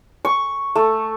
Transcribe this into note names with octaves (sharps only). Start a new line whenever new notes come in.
C#6
A3